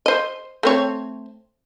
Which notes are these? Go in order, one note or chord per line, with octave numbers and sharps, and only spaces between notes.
C5 D#5
A3 C4 C#5